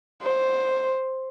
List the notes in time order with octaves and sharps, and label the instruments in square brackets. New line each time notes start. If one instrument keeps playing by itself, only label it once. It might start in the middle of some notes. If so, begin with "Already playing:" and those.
[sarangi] C5